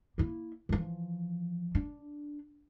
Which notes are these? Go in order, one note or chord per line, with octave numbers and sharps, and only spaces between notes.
A#3 E4
E3 F3
D4